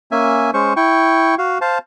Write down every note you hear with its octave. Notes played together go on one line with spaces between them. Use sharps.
A#3 C#4 E5 G#5
G#3 C#4 C5 C#6
E4 G5 C#6
F#4 F5
C5 F5 A5